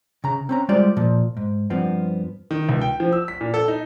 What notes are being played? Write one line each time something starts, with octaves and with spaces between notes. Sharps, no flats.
C#3 A#5
C4 C#4 A#5
G3 G#3 F4 C5 D5
A#2 F3
G#2
G2 F3 B3 C4
D#3
C#2
G5
F3
E6
B6
A#2
A4
D#4